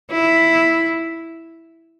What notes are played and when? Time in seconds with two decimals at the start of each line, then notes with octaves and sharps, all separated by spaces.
0.11 E4